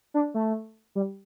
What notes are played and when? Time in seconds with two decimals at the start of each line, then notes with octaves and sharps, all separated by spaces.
0.14 D4
0.34 A3
0.95 G3